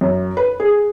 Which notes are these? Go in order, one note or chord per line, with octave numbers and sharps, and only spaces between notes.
F#2
B4
G#4